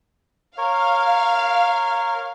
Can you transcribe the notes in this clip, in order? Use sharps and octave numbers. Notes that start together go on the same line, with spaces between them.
A#4 C#5 F5